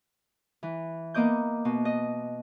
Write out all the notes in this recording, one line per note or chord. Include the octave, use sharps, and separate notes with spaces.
E3
A#3 B3 D#5 D6 G6
B2
D#5